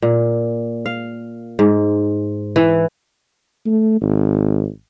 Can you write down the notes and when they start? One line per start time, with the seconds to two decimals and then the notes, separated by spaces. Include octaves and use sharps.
0.02 A#2
0.86 F5
1.59 G#2
2.56 E3
3.66 A3
4.01 G#1